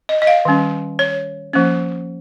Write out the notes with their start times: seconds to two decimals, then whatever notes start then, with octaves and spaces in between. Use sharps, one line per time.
0.09 D#5
0.22 D#5
0.27 F5
0.45 D#3 G3 C#4
0.99 C#5
1.53 F3 A#3 C#4